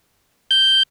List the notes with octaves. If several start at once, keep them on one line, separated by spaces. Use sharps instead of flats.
G6